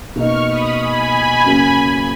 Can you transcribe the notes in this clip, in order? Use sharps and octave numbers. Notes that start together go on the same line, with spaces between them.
B2 A#3 D#4 C#6 F6
B5 D#6
G#5 B5
F#2 C#3 F#3 A#3